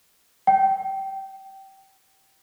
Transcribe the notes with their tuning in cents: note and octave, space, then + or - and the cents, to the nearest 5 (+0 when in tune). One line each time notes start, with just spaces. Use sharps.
G5 -20